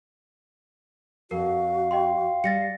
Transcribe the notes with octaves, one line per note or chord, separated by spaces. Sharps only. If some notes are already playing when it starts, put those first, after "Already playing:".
F2 F#4 A#4 F5
D#5 G5 C6
G3 A6 A#6 C#7